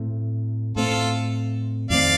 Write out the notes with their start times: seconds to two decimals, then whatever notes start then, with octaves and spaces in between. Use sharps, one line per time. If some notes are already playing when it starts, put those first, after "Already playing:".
Already playing: A2 A3 C4
0.76 A2 A3 C4 F4 A4
1.90 F2 D#3 A3 C4 D5 F5